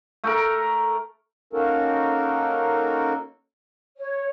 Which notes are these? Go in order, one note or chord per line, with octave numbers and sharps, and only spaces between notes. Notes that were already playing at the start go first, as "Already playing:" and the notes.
A3 A4 A#4
A#3 C#4 D#4 F#4 A4 A#4
C#5